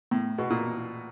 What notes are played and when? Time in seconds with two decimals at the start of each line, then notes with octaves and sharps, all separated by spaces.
0.11 A2
0.38 B2
0.50 A#2